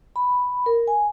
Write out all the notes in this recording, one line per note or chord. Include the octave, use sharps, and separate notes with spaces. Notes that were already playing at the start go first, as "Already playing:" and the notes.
B5
A#4
G#5